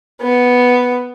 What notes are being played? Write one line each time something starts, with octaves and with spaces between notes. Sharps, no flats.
B3